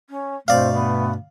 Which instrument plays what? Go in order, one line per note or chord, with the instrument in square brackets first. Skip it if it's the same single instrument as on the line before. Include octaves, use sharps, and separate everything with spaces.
[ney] C#4
[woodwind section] G2 B2 A3 [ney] C4 [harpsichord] D5 F5
[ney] B3